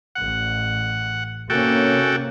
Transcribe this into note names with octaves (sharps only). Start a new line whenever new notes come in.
A1 F#5
C3 A#3 C#4 F#4 A4 G5